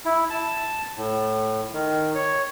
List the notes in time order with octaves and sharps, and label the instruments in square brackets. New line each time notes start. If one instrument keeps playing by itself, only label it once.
[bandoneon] E4
A5
A2
D#3
C#5